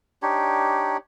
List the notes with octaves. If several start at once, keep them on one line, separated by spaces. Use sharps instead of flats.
D4 D#4 G4 C#5